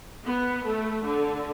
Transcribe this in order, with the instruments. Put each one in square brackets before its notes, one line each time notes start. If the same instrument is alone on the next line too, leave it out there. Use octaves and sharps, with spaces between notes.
[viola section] B3
A3
D3